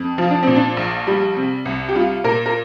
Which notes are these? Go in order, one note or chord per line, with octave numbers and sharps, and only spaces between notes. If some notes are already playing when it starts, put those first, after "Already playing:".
Already playing: F2
F3 F4
D4
A#2 C4
D4
A#1
G3
C3
C2
G4
G3 F4
A#2 A#4
A#4